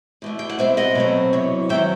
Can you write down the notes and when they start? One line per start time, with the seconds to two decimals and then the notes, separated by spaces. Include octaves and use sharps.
0.22 E2 B2 A3
0.39 G5
0.49 F#5
0.58 B2 G3 C4 C5 E5
0.77 D#5 F#5
0.95 B2 F#3 A3 C4
1.33 E2 C3 F#3
1.69 E2 D#3 F#3 C4 E5 G5